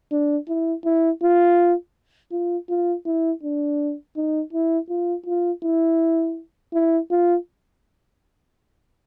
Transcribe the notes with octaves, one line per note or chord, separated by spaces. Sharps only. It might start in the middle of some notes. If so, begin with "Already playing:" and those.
D4
E4
E4
F4
F4
F4
E4
D4
D#4
E4
F4
F4
E4
E4
F4